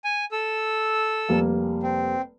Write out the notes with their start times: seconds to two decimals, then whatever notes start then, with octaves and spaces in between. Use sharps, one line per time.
0.04 G#5
0.32 A4 E6
1.29 F1 G3 A#3
1.83 C4